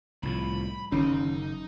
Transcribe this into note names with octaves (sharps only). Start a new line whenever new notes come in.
C2 A2 F3 B5
F#1 D#3 C#4 D#4